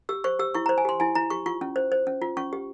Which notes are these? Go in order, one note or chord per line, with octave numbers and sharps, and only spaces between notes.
G4 E6
C5 C#6
G4 E6
E4 C#6
C5 A#5
G#5
G4 C6
E4 G#5
E4 A#5
G4 C#6
F4 C#6
C#4
C5
C5
C#4
F4
C#4 C#6
G4